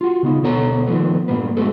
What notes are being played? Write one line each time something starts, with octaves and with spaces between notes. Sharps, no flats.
F4 F#4
C#3 B3 D#4
D2 B2 A4 C#5 A#5
D#3 F3 F#3 A3 B3
G2 A#2 A#3 B3 B4
G#3 A3 B3 F#4 G#4 A4